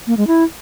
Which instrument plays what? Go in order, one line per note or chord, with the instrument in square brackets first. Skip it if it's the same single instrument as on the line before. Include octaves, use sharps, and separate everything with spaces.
[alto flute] A#3
G#3
E4